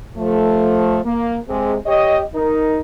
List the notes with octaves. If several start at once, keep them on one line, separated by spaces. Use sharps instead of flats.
F3 A3
A#3
C3 G#3
G4 C#5 D#5
D#4 A#4